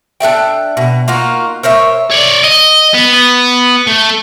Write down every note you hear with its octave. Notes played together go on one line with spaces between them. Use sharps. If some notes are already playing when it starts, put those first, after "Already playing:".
D4 A4 E5 G5
B2
A#3 D#4 F4 F#4
A#4 C5 C#5 E5
C#5 D5
D#5
B3
B3
A3